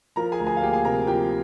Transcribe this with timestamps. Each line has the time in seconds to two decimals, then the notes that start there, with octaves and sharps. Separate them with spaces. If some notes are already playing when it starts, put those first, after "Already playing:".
0.16 F3 A#4 A#5
0.32 G#4 G#5
0.39 D2
0.46 G#4 G#5
0.57 F5
0.61 A#3 G4 G5
0.73 G#4 G#5
0.84 C3 A#4 A#5
1.07 F3 G4 G5